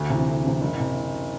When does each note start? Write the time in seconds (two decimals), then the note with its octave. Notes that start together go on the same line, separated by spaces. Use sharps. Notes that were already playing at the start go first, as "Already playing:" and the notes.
Already playing: D2
0.10 C3 E3
0.27 D2
0.45 C3 E3
0.61 F#1
0.79 C3